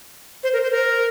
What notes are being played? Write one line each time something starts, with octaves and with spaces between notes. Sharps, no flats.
C5
A#4
C5
A#4